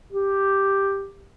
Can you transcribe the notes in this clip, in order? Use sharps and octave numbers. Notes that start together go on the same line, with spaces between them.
G4